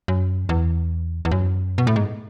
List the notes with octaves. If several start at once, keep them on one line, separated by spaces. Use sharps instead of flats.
F#2
E2
E2
F#2
B2
A2
G#2